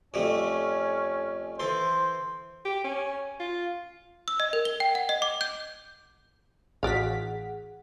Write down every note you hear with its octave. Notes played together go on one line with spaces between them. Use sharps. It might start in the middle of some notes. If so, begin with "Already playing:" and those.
F2 G3 A3 C#4
E3 A4 C5 C6
G4
C#4
F4
E6
D#5
A#4
G7
G5
F#5
D#5
D6
G6
A1 F#4 G#4 D5 F5 F#5 B6